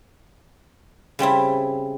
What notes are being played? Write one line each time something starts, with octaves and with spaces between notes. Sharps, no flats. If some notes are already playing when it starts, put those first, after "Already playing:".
C#3 G3 C4 E4